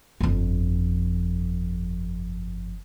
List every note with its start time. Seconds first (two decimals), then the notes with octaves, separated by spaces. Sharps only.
0.21 G1 F2